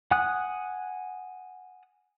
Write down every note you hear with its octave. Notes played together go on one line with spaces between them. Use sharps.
F#5 G#5 D#6 F#6